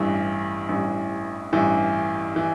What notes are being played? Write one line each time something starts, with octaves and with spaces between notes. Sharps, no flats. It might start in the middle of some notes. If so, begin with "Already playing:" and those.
Already playing: A1 G2 E3
A1 G2 E3
A1 G2 E3
E3